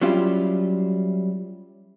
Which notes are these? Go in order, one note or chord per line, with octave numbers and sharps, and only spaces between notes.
F#3 G3 C#4 E4 F4 G4